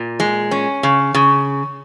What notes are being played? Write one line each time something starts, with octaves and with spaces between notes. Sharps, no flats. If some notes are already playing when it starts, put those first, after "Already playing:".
Already playing: A#2
G#3
C#4
C#3
C#3